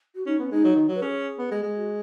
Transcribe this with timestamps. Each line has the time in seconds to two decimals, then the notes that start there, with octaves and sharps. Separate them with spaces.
0.14 F#4
0.26 C#4 D#4
0.39 B3 C#4
0.51 G#3 D#4
0.64 F#3
0.76 D#3
0.88 F#3
0.94 B4
1.02 C#4 G#4
1.38 B3
1.51 G#3
1.63 G#3
1.76 F#4